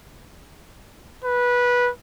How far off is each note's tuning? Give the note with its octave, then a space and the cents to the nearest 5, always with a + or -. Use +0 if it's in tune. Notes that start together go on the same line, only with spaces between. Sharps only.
B4 -15